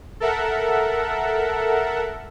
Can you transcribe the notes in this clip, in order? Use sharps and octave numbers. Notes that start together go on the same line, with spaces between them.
A4 A#4 E5 F#5